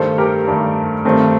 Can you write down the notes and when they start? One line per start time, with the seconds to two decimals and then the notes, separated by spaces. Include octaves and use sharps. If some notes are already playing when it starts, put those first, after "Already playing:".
Already playing: G2 D#3 A3 A4 C5
0.18 G4 A#4
0.47 G2 D#3 A3
1.05 G2 D#3 A3 C4